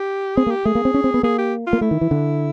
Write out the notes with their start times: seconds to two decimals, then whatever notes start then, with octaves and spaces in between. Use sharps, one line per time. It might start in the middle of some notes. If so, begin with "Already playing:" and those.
Already playing: G4
0.37 C4 G#4
0.46 A#3
0.51 G4
0.65 A3 G#4
0.75 A#3
0.85 C4
0.94 C#4
1.04 C4
1.14 B3
1.23 A#3 G#4
1.38 G4
1.67 F4
1.73 A#3
1.81 A3 E4
1.91 D#3
2.01 E3
2.11 D3